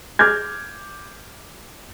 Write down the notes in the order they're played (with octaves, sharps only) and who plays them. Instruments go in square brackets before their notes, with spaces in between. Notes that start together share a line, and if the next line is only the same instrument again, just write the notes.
[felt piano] D6 F6 G6 G#6